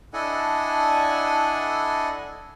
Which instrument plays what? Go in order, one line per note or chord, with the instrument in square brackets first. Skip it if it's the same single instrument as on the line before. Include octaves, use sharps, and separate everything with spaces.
[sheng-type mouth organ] D4 E4 A4 D#5 F#5 G#5